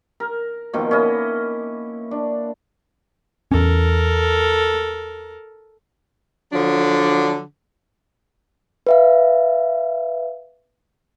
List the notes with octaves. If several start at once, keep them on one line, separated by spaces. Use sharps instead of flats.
A#4
B2 D#3 F3 A#3
C#4 E4 D#5
D4
E2 C#4 A4 A#4
D3 F3 F#3 D4
B4 E5 F5